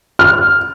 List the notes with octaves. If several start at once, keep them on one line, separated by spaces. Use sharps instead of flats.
F6